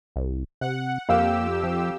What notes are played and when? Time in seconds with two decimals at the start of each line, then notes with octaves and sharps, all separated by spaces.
0.16 C2
0.61 C3 F#5
1.09 F2 A#3 G4 F5 E6
1.64 F3